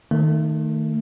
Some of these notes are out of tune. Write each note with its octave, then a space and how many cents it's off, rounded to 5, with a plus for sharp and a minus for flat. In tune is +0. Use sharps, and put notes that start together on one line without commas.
D#3 +0 A3 +25